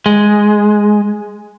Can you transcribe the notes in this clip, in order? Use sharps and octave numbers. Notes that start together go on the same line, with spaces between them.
G#3